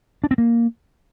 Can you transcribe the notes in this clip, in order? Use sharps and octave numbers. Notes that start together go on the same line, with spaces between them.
D4
C4
A#3